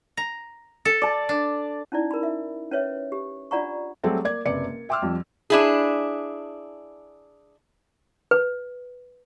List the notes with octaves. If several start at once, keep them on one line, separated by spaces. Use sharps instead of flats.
A#5
A4
D5 A5
D4
C#4 D#4 E4 D5
A#4 B5
E5
C#4 B4 C#5 E5
G4
D4 F4 D5 F#5 A#5 C#6
F#3 G3 A3 C4 G#4 A4
A#3 D5 G#6
F#1 C3 B4 D5 C#7
A#3
E5 G5 C6 D6 E6 F6
F2 F3 G3
D4 E4 G#4
B4